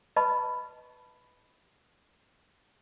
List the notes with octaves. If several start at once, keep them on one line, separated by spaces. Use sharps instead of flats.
B4 D#5 A5 B5 C#6